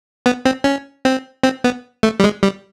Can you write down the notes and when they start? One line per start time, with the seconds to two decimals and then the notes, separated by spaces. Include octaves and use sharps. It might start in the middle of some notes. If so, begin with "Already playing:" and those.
0.26 B3
0.45 C4
0.64 C#4
1.05 C4
1.43 C4
1.64 B3
2.03 A3
2.20 G3
2.24 G#3
2.43 G3